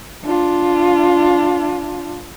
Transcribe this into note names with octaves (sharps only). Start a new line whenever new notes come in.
D4 F4